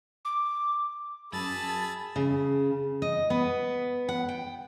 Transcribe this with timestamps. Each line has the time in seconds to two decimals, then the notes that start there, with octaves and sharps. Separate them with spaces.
0.25 D6
1.33 F#2 G#4 A5 B5 E6 A6
2.16 C#3
3.02 D#5
3.30 B3
4.09 F#5
4.29 G5